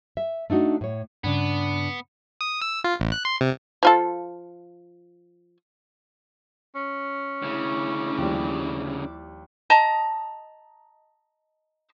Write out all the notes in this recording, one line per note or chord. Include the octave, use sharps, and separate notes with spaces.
E5
A3 D4 D#4 F#4
A2 C#5
G2 C#3 B3 D4
D#6
E6
F4
A1
F#6
C6
C3
F3 F4 A4
C#4
D2 C#3 E4 D6
D#2 F3 G3
D#5 A5 A#5